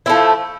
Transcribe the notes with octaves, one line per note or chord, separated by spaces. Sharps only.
F3 A3 C4 E4